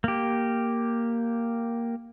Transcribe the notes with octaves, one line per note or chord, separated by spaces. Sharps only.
A#3 G4